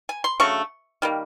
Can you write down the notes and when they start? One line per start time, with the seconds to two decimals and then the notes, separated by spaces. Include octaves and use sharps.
0.09 G#5
0.24 C6
0.40 C#3 F#3 A3 D4 C#6
1.02 D#3 G3 A#3